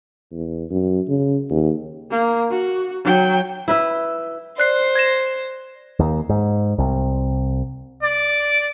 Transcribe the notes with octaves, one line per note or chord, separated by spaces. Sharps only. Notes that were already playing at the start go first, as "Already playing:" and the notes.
E2
F#2
C#3
D#2
A#3
F#4
F#3 G5
E4 B4 E5
C5 D5 F#6 C7
G#6 A#6 E7
D#2
G#2
C2
D5